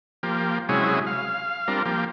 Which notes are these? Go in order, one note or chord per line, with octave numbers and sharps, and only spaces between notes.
F3 A#3 G4
C3 F#3 G#3 C#4 E4 G#4
F5
G3 C4 D4 F4 A#4
F3 A#3 G4